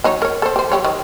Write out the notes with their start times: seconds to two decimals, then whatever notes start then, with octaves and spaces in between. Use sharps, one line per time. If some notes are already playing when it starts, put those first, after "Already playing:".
0.04 F#3 D#4 C#5
0.22 A#4 C#5
0.42 A4 C5
0.56 G4 C5
0.72 F#3 G4 C#5
0.85 D#3